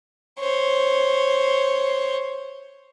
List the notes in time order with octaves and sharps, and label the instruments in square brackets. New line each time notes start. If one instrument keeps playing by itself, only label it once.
[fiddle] C5 C#5